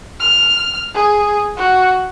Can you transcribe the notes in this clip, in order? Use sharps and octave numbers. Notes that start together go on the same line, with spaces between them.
F6
G#4
F#4